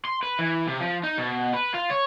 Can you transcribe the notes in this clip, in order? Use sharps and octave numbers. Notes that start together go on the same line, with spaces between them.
C6
B4
E3
C3
F3
D#4
B2
B4
F4
C#5